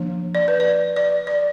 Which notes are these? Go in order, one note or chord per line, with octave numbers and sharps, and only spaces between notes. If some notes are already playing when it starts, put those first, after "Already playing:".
Already playing: F3 A#3 D4
D5
B4
D5
D5
D5